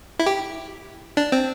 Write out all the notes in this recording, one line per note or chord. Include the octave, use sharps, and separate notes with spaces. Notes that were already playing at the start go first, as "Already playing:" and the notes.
E4
G4
D4
C4